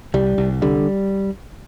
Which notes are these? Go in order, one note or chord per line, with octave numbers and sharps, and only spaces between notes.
C2 G3
C2
D3 G3